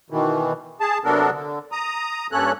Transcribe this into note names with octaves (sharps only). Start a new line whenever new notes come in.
B2 D#3 E3
G#4 A5
C3 F#3 B3 D4 A4 A#4
D3
A#5 D#6
G2 A#3 C#4 A4 C#5 F#6